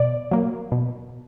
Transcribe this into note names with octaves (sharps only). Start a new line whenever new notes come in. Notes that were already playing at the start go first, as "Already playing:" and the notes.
Already playing: B2 D5
F#3 A#3
B2